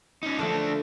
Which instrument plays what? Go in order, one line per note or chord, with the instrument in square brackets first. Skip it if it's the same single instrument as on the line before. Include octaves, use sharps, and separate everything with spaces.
[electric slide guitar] C#4 D#4
[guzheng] D3 F3 F5 [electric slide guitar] A3 D4